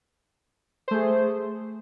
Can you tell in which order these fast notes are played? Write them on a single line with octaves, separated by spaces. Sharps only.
C5 A3 G#4